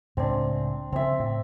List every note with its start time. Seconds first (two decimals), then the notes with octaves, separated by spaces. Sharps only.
0.17 C#2 A2 C4 D4
0.93 C#3 F3 C4 E5
1.20 A2